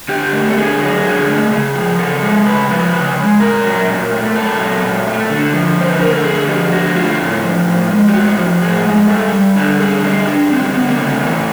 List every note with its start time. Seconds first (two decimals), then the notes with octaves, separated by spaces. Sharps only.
0.09 D3 G4
0.33 A3
0.50 A4
0.57 D3 G#4
0.81 F#3
1.04 D3 G#4
1.27 A3
1.51 C#3 G#4
1.75 F3
1.99 C#3 A4
2.22 G#3
2.46 C#3 B4
2.69 F3 B4
2.93 C#3 B4
3.17 G#3
3.40 A#2 A#4
3.64 F#3
3.88 A#2
4.11 A3
4.35 A#2 A4
4.59 F#3
4.83 A#2
5.07 A3
5.30 D3
5.53 F3
5.78 D3 C5
5.91 B4
6.01 A3 A#4
6.13 A4
6.25 D3 G#4
6.49 F3 G4
6.72 D3 F#4
6.96 A3 F4
7.19 A2
7.43 F3
7.66 A2
7.91 G#3
8.08 G4
8.14 A2 F#4
8.38 F3
8.62 A2 G#4
8.85 G#3
9.09 G3 A4
9.32 G3
9.56 D3 A4
9.79 D3 G#4
10.03 G3 G#4
10.27 G3 D4
10.51 D3 C4
10.74 D3 B3
10.90 A#3
10.98 C#3 A3
11.22 E3